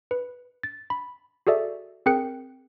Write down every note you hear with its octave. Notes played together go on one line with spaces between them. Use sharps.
B4
A6
B5
F#4 G#4 A4 D5 E5
C4 G#4 A#4 G5 F#6 C#7